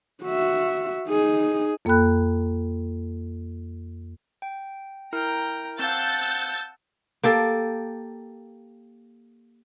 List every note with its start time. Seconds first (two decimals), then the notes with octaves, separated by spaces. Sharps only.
0.24 F#4 E5
1.08 D#4 G#4
1.85 F2 A#3 A4 G5 B5 F#6
4.42 G5
5.13 E4 A#4 G5 A#5 F6
5.79 C4 F5 F#5 A5 E6 G6 A6
7.23 A#3 G4 A4